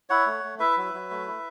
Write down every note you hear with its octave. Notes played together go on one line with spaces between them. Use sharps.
E4 C#5 F#5
A3
A3
E4 B4 E5
F#3
F#3
A3
E4